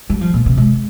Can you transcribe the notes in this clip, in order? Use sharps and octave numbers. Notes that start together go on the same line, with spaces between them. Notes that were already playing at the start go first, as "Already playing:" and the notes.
G3
F3
A#2
C3
G#3